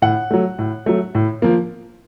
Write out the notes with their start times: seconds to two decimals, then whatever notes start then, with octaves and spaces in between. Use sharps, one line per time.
0.02 A2 F#5
0.31 F#3 A3
0.59 A2
0.86 F#3 A3
1.15 A2
1.42 F3 A#3